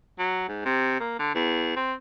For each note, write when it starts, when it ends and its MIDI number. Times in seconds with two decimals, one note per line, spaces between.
0.19 0.47 54
0.48 0.63 44
0.65 0.98 48
1.00 1.17 58
1.19 1.34 50
1.35 1.76 40
1.76 1.93 60